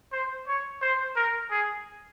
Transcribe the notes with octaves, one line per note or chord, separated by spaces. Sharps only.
C5
C#5
C5
A#4
G#4